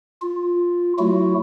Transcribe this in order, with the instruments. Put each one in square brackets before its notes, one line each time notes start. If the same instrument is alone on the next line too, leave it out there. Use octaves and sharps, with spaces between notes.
[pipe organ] F4
F#3 A3 E4 F#4